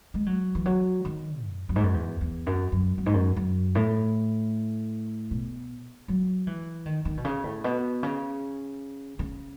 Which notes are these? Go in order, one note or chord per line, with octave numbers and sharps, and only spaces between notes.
G#3
F#3
E3
F#3
D#3
F#2
F#2
G#2
F#2
E2
E2
F#2
F#2
F#2
G#2
F#2
F#2
A2
B2
F#3
E3
D#3
D#3
B2
C#3
A2
B2
C#3
C#3